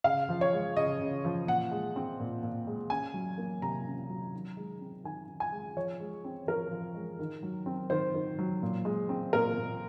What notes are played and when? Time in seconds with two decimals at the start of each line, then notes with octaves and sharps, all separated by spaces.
0.04 C#3 F5
0.29 F3
0.41 C#5
0.53 G#3
0.76 C#3 D#5
1.01 C#3
1.25 F3
1.47 A#2 F#5
1.71 G#3
1.96 C4
2.20 A#2
2.43 A#2
2.67 G#3
2.90 C#4 G#5
3.14 F#3
3.38 A#3
3.62 C3 A#5
3.86 C#4
4.10 F#3
4.34 D#3
4.57 G#3
4.81 C4
5.04 D#3 G#5
5.28 D#3
5.40 G#5
5.52 G#3
5.77 F3 C#5
6.00 G#3
6.24 C4
6.47 F3 A#4
6.71 F3
6.95 G#3
7.19 D#3
7.43 F#3
7.66 C4
7.90 D#3 C5
8.14 D#3
8.39 F#3
8.62 A#2
8.85 G#3
9.09 C4
9.33 A#2 A#4
9.58 A#2